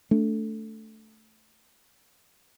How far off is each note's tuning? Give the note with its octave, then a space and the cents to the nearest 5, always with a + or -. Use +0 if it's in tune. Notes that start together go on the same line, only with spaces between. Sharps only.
A3 +0 D4 -15